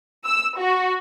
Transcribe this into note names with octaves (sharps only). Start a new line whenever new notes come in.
E6
F#4